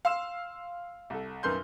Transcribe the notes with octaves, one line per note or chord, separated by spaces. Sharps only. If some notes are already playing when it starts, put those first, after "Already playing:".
F5 C6 E6 E7
C2 A4
B1 F#2 A#4 B4 C6 G6